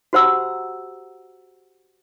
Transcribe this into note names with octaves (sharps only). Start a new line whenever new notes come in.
F#4 G4 C5 F#5 A#5 E6